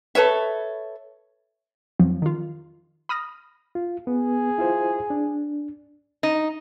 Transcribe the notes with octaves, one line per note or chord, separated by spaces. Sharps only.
A4 B4 C#5 E5
F2 F3 F#3 C4
D#3 F4
B5 D#6 F6 A#6
F4
B3 G#4
E4 F4 C5
D4
D#4